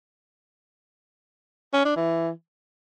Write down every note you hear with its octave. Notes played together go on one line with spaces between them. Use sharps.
C#4
D4
E3